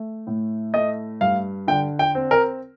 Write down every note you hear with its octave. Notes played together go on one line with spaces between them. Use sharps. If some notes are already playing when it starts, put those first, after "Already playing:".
Already playing: A3
A2
A3 D#5
G2 F5
D3 G5
G5
C4
A#4